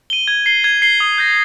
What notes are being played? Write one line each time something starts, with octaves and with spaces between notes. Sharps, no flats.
D#7 G7
G#6
C7 G7
G#6
C7 G7
D#6
G6 A#6